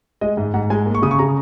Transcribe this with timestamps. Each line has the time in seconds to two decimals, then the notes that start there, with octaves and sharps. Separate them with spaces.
0.21 G#3 D#5
0.37 G#2
0.54 G#2 F#5
0.70 G#3 G#5
0.86 A#3
0.95 C#6
1.02 C#3 D#6
1.11 C#6
1.19 C#3 A#5